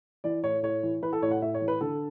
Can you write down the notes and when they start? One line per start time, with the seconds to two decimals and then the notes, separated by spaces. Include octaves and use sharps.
0.24 E3 D5
0.44 A2 C#5
0.63 A2 C#5
0.83 E3
1.02 E3 B4
1.13 A4
1.22 A2 C#5
1.31 F#5
1.42 A2 E5
1.54 C#5
1.61 E3
1.68 B4
1.81 D3 A4